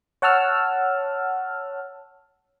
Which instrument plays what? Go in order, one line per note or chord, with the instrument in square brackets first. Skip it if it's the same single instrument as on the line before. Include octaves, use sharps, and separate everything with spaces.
[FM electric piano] C#5 F#5 A5 E6 F6